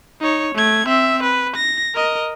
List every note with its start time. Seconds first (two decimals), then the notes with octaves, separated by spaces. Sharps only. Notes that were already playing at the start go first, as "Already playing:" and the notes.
0.21 D#4 C#5
0.55 A3 G#6
0.87 C4 E5
1.23 B4
1.56 A#6
1.95 A#4 D#5